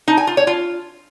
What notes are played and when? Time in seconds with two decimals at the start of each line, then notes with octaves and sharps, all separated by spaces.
0.08 D#4
0.17 G#5
0.27 F4
0.37 C#5
0.47 F4